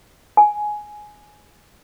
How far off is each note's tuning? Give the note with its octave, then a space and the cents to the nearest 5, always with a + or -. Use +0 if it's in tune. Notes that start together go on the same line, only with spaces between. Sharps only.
G#5 +10